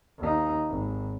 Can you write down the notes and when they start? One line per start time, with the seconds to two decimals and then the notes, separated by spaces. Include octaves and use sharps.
0.18 D#2 D#4
0.69 G#1